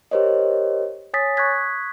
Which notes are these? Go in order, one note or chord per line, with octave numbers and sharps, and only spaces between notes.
G4 A#4 C5 C#5 D#5
C#5 G#5 D#6 A6 B6
C#6 D#6 F#6 G#6 B6